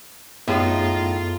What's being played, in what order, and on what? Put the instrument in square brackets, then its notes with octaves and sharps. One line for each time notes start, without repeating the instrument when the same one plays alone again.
[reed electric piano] F#2 B3 [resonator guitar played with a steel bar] A2 D#4 [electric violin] F4 [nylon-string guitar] G#4 C#5 E5